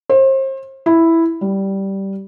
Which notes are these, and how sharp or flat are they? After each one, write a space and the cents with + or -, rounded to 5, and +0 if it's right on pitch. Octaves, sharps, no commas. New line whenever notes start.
C5 +35
E4 +0
G3 -10